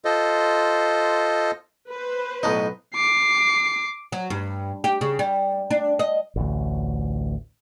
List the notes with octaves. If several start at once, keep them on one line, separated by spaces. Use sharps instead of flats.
F4 A4 C5 D#5
B4 C5
B1 A2 D#4 D#5
D6 C7
F#3
G2
G4
C#3
G3
D4
D#5
A1 D2